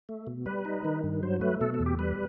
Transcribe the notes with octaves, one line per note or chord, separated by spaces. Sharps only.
A3
B2
G3 B4
D#4
D#3
G2
F#3 C5
A3 B4
B2 A4
A4
E2
G4
G3 B4